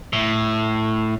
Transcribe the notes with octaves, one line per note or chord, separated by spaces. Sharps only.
A2